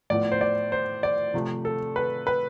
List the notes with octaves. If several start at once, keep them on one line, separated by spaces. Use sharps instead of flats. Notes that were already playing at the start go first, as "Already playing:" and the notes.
A2 F3 B3 D5
C5
D5
C5
D5
C3 F3 A3
A4
B4
B4